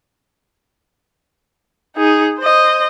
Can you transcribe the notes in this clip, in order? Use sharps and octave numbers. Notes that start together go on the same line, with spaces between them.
D#4 G#4
C5 D#5